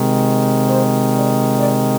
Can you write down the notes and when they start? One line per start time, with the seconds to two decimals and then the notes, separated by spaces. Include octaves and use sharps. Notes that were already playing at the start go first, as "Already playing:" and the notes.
Already playing: C3 D#3 G#3
0.70 C5
1.15 D5
1.59 D5